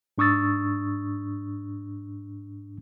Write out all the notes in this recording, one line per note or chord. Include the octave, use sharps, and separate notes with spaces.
G#2 D4 C#6 D#6 E6 A6